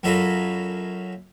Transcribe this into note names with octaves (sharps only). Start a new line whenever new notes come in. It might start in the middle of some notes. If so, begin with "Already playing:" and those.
F#2 F#3 F4 A4 D#5 B5